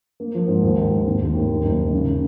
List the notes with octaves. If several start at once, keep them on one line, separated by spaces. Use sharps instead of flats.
A#3
F3
G#2
D#2
D#2
D#3
C4
D#2
D#2
D#3
F#1
F#1
C#3
C#3